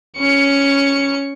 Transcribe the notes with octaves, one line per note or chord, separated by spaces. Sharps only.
C#4 C#7